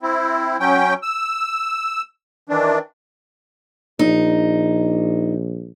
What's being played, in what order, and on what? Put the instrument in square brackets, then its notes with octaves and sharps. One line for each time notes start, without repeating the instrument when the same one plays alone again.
[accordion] C4 E4
F#3 C#4 G5
E6
D#3 E3 D4
[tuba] A#1 [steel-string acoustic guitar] D#4